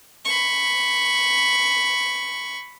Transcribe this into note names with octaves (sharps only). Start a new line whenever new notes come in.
B5 C#6